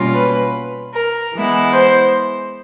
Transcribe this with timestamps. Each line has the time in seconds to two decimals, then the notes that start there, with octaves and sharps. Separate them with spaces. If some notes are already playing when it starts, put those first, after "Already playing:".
Already playing: B2 G3 A#3 C#4 F4
0.15 B4
0.95 A#4
1.35 E3 G#3 B3 E4
1.73 C5